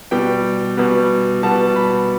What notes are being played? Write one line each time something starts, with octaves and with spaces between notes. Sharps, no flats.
B2 G3 B3 G5
B2 G3 B3
B2 G3 B3 A5
B5